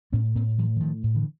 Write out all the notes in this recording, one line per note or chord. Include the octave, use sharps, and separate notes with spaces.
A2 B3 C#4
A2 A#3 C4
A2 E3 F#3
E3
A2 D#3 F3
A2
D3 E3